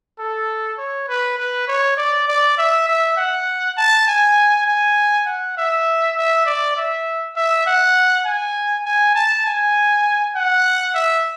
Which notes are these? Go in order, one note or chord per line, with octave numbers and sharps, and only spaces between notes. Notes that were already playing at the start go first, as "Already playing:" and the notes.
A4
C#5
B4
B4
C#5
D5
D5
E5
E5
F#5
A5
G#5
G#5
F#5
E5
E5
D5
E5
E5
F#5
G#5
G#5
A5
G#5
F#5
E5